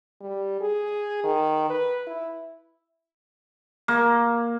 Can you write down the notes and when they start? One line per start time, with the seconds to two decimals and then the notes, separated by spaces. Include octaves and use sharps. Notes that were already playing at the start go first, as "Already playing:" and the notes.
0.21 G3
0.60 G#4
1.24 D#3
1.70 B4
2.07 E4
3.88 A#3